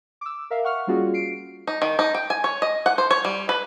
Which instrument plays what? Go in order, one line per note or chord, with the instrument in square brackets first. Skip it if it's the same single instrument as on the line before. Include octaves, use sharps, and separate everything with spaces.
[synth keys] D6 E6
A#4 E5 F5
F#5 C#6 F6
G3 A#3 C#4 F4 F#4 G#4
C7 D7
[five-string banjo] D#4
D#3
D#4
G5
G#5
C#5
D#5
F#5
C5
C#5
G3
B4